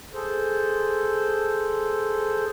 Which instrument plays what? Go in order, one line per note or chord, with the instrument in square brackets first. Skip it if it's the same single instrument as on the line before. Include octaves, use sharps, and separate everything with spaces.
[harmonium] G#4 A4 C5